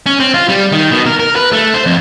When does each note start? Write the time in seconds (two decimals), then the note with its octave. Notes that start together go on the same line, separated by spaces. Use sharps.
0.06 C#4
0.20 C4
0.34 F4
0.49 G3
0.72 D#3
0.91 B2
1.06 A#4
1.19 A#4
1.36 B4
1.52 A3
1.74 C5
1.86 F2